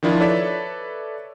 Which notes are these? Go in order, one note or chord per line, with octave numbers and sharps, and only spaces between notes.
D#3 F3 D4 E4 F4
A4 B4 C#5 D5 E5